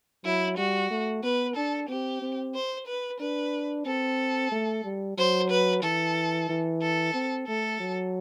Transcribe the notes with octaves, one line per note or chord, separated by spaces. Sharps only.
F#3 E4
G3 F#4
A3
B3 B4
D4 A4
C4 G4
C4
C5
B4
D4 B4
C4 A4
A3
G3
F#3 C5
B4
E3 A4
E3
A4
C4
A3 A4
F#3